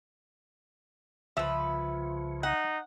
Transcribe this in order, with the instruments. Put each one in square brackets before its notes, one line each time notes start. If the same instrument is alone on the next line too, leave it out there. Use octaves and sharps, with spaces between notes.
[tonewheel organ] C2 C#3 [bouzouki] F3 B4 [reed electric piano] E5 E6
[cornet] D#4 [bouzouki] F#5